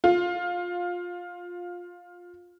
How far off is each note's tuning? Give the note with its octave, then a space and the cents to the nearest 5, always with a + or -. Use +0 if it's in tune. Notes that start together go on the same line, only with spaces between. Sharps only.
F4 +15